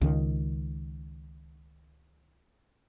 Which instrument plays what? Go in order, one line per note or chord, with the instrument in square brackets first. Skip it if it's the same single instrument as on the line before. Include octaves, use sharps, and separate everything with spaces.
[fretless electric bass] C#2 D#3